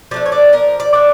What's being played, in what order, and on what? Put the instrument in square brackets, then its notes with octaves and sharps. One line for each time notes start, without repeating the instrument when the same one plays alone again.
[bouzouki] F3 A3 D4 D5
C#5
D5
F3 A#4
D5
A3 D4